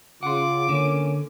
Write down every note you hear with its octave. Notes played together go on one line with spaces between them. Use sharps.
C#3 F4 F#5 C6 D6
D3 A#3 C#4